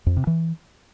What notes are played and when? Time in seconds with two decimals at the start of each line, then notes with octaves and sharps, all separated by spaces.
0.06 F2
0.17 C3
0.27 E3